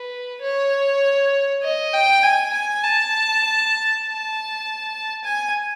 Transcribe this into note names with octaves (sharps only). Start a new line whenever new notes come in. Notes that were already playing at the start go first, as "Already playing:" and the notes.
Already playing: B4
C#5
D#5
G5
G#5
G#5
A5
A5
G#5